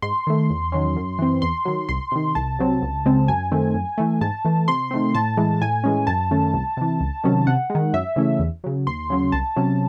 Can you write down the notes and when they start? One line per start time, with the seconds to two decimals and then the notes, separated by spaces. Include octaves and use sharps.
0.02 G#2 C6
0.27 D#3 A3
0.50 E2
0.72 D#3 F#3 C#4
0.96 F#2
1.19 E3 C4
1.42 E2 C6
1.65 D#3 F#3
1.89 C2 C6
2.12 C3 D#3
2.35 C2 A5
2.59 C3 F#3 C4
2.82 C#2
3.06 C#3 G#3 C4
3.28 F#2 G#5
3.52 D#3 A3 C4
3.74 F#2
3.98 E3 A3
4.21 G#2 A5
4.45 E3 A3
4.68 C3 C6
4.91 D#3 A3 C4
5.15 A2 A5
5.37 E3 G#3
5.61 A2 G#5
5.84 E3 G#3 C#4
6.07 F#2 A5
6.31 D#3 A3 C#4
6.53 C2
6.77 C3 E3
7.00 C#2
7.24 C3 D#3 F#3 C#4
7.47 C3 F#5
7.70 G#3
7.75 D#3
7.93 F#2 E5
8.16 C#3 E3 A3 C#4
8.39 E2
8.64 C#3 F#3
8.87 D#2 C6
9.10 C#3 F#3 C#4
9.32 C2 A5
9.56 C3 F#3 C#4